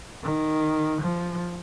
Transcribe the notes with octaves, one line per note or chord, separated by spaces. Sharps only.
D#3
F3